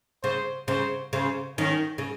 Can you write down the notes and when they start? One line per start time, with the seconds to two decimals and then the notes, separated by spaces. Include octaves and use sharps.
0.23 C#3 C5
0.68 C#3 C5
1.13 C#3 C5
1.58 D#3 C#4
1.98 C#3